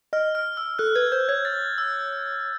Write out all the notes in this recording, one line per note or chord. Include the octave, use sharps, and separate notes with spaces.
D#5 F6
F6
E6
A4 F#6
B4 G#6
C5 G6
C#5 G#6
A6
E6